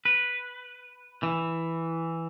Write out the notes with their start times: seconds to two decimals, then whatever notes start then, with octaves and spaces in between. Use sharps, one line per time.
0.05 B4
1.23 E3